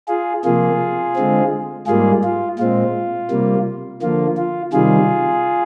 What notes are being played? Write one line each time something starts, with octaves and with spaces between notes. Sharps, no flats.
F4 G#4
C3 F3 A#3 F4 G#4
D3 G#3 C4
G#2 G3 A#3 F4 G#4
F4
A#2 G#3 C4 F4
C3 G3 A#3
D3 F3 A#3 F4
F4
C3 D#3 G3 F4 G#4